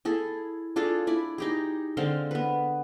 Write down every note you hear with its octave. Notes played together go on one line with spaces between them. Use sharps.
E4 G#4 A4
D4 F4 G#4 A4
E4 D5 G#5 B5
D#4 G4 G#4
D3 G#3 C4 F5
B3 B4